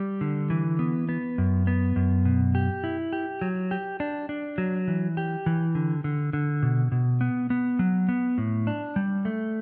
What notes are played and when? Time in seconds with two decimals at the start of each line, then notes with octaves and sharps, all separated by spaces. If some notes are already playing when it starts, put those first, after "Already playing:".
Already playing: G3
0.21 D3
0.50 E3
0.79 B3
1.09 B3
1.38 F#2
1.67 B3
1.96 F#2
2.25 B2
2.55 G4
2.84 E4
3.13 G4
3.41 F#3
3.71 G4
4.00 D4
4.29 D4
4.58 F#3
4.88 E3
5.17 G4
5.46 E3
5.75 D3
6.04 D3
6.33 D3
6.63 B2
6.92 B2
7.21 B3
7.50 B3
7.79 F#3
8.09 B3
8.38 A2
8.67 D4
8.96 G3
9.25 A3